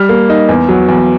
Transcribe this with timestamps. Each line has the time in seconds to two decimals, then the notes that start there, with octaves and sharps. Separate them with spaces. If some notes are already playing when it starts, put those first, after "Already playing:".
Already playing: G3 F6
0.09 A#3
0.29 D#4
0.49 E2
0.69 F#3
0.88 E2